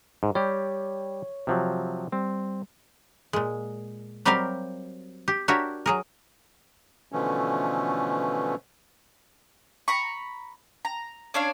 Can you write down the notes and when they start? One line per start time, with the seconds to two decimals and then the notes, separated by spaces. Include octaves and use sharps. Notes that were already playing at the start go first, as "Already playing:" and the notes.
0.23 G#2
0.35 G3 G4 C#5
1.47 C3 F3 F#3
2.12 G3 C4
3.33 A#2 G#3
4.25 F#3 G3 C4 G4 A#4 F5
5.28 G4
5.48 D4 F#4 G4 A#4 C#5 E5
5.86 F#3 G#4 A#4
7.12 B2 D3 E3 F3 A3 C#4
9.88 A#5 B5 C#6
10.85 A#5
11.34 C#4 D4 C#5 F5